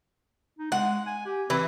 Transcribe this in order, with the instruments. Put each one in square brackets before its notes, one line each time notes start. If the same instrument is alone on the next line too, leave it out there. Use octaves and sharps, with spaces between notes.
[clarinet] D#4
[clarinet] G#3 [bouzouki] F#5
[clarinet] G#5
G4
[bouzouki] E3 [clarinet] C4